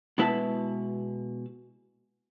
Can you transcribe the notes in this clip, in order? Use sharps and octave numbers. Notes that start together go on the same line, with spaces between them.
B2 G#3 E4 B4 E5 A5